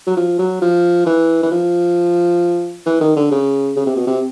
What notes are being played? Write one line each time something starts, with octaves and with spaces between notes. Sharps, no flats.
F#3
F3
F#3
F3
E3
E3
F3
E3
D#3
D3
C#3
C#3
C3
B2
C3